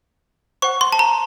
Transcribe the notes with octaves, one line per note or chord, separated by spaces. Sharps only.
C5 F#5 C#6
C6
A5
A#5